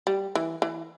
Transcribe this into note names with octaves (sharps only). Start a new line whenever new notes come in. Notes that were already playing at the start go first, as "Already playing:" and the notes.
G3
E3
E3